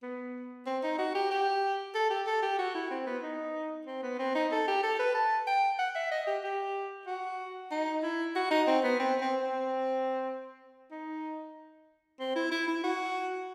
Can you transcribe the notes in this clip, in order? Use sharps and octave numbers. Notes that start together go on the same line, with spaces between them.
B3
C4
D#4
F#4
G4
G4
A4
G4
A4
G4
F#4
E4
C4
B3
D#4
C4
B3
C4
D#4
A4
G4
A4
B4
A5
G5
F#5
E5
D#5
G4
G4
F#4
D#4
E4
F#4
D#4
C4
B3
C4
C4
C4
D#4
C4
E4
E4
E4
F#4